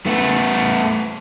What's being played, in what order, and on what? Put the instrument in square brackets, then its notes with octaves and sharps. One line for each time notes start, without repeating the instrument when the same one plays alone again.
[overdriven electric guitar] A3 B3